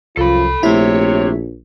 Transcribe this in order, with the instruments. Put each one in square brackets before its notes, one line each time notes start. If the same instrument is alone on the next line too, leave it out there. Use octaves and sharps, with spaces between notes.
[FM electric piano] C2 [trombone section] F#2 F3 F4 [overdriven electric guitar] A4 B5
[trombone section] A#1 [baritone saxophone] C3 [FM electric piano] A3 E4 [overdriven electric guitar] C#5